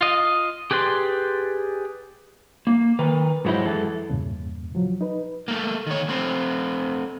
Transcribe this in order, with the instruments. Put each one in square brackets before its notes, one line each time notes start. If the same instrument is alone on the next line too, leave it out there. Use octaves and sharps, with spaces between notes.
[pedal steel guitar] F4 D#5
G4 G#4 B4 D5 C6
[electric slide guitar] A#3
D#3 A#4 B4
G#2 F#3 E4 C5 D#5
F#2 E3 G#3 A4
[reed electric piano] E2 G2 A#2 C#3
F3 F#3
D#4 B4
[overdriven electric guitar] A3 A#3
D#3 C#5
A3 C4